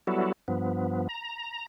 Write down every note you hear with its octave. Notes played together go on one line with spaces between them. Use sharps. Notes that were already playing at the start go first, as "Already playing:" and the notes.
F#3 G3 B3 E4 F#4 A4
G2 F3 B3
A#5